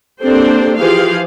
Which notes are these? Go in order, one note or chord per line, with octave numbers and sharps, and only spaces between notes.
A#3 C4 D4 G4 A4 C5
E3 F3 G4 G#4 C5 F5